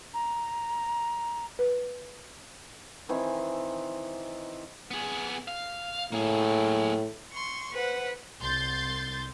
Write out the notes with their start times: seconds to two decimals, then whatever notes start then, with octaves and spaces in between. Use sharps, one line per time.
0.14 A#5
1.59 B4
3.09 D#3 E3 C4
4.91 B3 G#4
5.48 F5
6.12 A2 A#3 G#4
7.33 C6 C#6
7.73 B4 C5 F#5
8.40 C2 C6 G6 A6